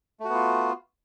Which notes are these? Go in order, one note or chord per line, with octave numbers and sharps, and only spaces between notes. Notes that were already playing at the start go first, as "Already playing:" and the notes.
A3 B3 F4 F#4